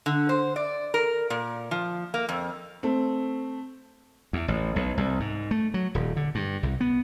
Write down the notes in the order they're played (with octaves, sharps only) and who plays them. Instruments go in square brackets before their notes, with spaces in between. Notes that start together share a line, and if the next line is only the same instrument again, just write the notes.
[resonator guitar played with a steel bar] D3
C5
D5
A#4
A#2
F3
A#3
F2
[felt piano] A3 C4
[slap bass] E2
A1
B1
C2
G#2
A3
F#3
D#1
D3
G2
C2
B3